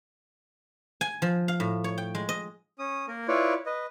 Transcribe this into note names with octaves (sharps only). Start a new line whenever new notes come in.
G#5
F3
F5
A2
C#5
G5
G#3
D#5
C#4 D#6
A#3 A#4
E4 F4 B4 C#5 D5
B4 D#5